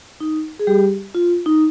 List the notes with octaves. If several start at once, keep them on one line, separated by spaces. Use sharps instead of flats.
D#4
G#4
G3 G4
F4
D#4